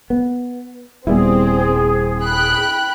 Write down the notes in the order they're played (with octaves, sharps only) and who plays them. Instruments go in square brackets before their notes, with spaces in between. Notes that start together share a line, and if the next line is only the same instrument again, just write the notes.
[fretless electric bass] B3
[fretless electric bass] D#1 G3 B3 [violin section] C4 [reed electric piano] E4 [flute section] G#4
[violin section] G5 B5 F#6